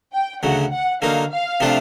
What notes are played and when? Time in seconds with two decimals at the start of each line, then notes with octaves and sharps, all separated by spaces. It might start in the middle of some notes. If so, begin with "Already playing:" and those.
0.13 G5
0.42 D2 C#3 F#3 F#5
0.72 F#5
1.02 D3 F#3 A#3 D#4 F5
1.31 F5
1.60 C3 F3 A3 D4 F4